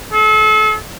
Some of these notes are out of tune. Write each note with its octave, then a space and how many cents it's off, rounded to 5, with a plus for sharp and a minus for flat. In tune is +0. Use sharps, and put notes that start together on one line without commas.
A4 -35